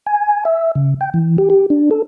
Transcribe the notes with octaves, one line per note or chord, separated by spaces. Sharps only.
G#5
E5
C#3
G5
E3
G4
G4
D4
A4